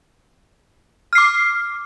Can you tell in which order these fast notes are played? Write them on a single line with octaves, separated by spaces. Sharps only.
F6 C7 D6